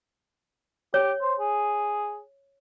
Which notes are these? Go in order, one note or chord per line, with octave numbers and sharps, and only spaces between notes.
G4 C#5
C5
G#4